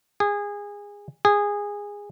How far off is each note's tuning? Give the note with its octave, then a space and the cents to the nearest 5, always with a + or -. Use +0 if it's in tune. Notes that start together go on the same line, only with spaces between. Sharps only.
G#4 -25
G#4 -20